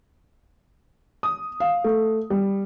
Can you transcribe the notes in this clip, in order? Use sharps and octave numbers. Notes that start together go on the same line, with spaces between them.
D#6
F5
A3
G3